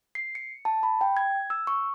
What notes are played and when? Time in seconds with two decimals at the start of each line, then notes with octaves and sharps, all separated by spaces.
0.15 C7
0.35 C#7
0.65 A5
0.83 B5
1.01 G5
1.17 G#6
1.50 E6
1.67 C#6